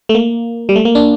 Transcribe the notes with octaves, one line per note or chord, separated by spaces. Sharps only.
A3
A#3
G3
A3
A#3
D4